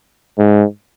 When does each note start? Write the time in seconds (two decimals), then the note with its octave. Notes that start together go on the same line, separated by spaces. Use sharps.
0.38 G#2